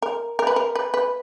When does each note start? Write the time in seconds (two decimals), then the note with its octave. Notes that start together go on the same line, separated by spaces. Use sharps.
0.02 A#4
0.39 A#4
0.47 B4
0.56 A#4
0.75 B4
0.94 B4